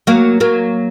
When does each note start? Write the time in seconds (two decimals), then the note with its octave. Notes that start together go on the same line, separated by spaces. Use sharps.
0.07 F#3 A#3
0.40 F#3 A#3